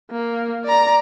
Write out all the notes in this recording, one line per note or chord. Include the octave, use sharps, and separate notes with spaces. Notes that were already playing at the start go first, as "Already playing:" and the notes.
A#3
D5 A#5